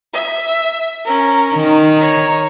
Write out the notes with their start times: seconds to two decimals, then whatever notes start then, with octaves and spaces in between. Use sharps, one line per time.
0.14 E5
1.05 C#4 A#4
1.55 D#3
1.97 C#5 A#5